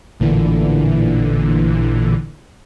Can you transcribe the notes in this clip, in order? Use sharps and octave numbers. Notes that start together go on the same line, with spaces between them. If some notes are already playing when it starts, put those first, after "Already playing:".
A1 A#2 D3 E3